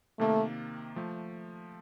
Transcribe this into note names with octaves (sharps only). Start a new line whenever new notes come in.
C3 D#3 A3 A#3
F3 A3